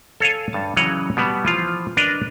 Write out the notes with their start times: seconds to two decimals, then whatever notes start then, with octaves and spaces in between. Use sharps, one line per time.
0.20 A4 C#5 F5 G#5
0.53 G2 A5
0.76 C#3 E3 F#3 C#5 D#5 F#5
1.17 B2 G3 B3
1.45 E3 F3 F4
1.97 D4 A#4 B4 D#5